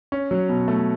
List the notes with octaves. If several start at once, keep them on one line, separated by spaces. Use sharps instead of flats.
C#4
F#3
B2
A3